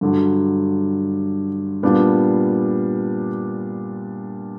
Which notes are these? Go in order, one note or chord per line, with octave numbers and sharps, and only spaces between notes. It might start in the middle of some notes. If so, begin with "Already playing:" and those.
G2 D3 F#3
A#2 G3 B3 D4 F4